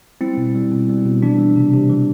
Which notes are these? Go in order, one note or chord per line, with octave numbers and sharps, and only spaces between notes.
G3 C4 E4
B2
G3
B2
G3
B2
E3 D4
G3
C3
C3
E3